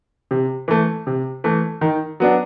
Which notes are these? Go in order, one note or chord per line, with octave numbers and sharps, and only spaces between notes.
C3
E3 A3
C3
E3 A3
D#3
F#3 B3 D4